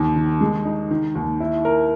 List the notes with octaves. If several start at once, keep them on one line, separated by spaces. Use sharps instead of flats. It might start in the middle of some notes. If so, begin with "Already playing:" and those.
Already playing: D#2
D#3
G#3
D#4
D#3
D#2
E4
A#4